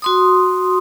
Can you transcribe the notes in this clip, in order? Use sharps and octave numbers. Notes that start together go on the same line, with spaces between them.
F#4 C6 D#6